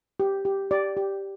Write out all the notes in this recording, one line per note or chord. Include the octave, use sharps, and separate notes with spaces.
G4
G4
G4 D5
G4